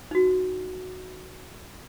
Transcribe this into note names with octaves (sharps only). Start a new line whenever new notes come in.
D#4 F#4